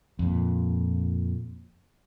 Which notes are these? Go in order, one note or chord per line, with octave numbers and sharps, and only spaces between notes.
F2 A#2